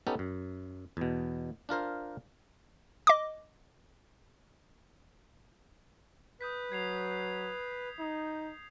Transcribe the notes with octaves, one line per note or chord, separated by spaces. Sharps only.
B3 C#4 D#4 G4 A4
F#2
E2 B2
D4 F4 A#4 C5
D#5 D6
B4 D#6 G6 B6
F#3 G#6 C7 F7
D#4